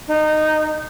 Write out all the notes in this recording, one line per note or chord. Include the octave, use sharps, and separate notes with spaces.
D#4